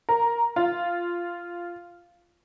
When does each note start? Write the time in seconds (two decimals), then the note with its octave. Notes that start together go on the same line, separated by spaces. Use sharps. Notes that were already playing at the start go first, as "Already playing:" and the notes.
0.09 A#4
0.56 F4